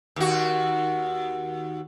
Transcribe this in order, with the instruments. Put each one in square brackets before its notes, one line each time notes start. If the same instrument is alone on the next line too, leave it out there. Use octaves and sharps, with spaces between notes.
[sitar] D#2 F#4